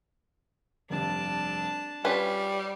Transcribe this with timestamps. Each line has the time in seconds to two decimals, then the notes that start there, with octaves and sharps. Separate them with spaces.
0.90 F1 G2 D4 A5
2.05 G3 C#4 F4 B4 G5